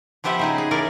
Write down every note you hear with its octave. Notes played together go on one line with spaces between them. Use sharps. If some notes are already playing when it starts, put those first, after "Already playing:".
F3 B3 G4 C5 E5 F#5
C#3 D#4 G#4
G#4
E3 A#4 C#5 D5